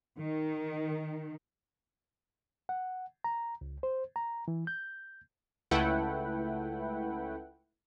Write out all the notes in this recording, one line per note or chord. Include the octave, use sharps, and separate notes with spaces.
D#3
F#5
A#5
C#2
C5
A#5
E3
G6
C#2 A3 E4 B4 F#5 G5